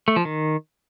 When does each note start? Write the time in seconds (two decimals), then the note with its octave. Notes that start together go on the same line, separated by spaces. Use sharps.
0.08 A3
0.16 F3
0.25 D#3